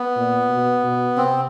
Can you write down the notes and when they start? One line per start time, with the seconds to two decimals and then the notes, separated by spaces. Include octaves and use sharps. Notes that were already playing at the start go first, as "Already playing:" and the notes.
Already playing: B3
0.16 A#2
0.50 B2
0.84 B2
1.17 C3 C4